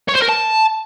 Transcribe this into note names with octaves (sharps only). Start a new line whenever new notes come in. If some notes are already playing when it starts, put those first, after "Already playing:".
C#5
C5
A#4
A5